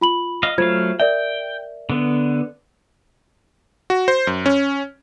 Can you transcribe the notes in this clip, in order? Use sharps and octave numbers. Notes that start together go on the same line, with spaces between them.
F4 B5 F#7
D#5 F5
F#3 A3 F4 C5 F5 G#6
A#4 D5 E5 G5
D3 B3
F#4
C5
F#2
C#4